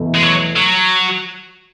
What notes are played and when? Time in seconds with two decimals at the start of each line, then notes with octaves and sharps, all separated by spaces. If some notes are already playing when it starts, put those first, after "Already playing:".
Already playing: E2 B2 A3 E4
0.15 G#3
0.23 F#3
0.57 F#3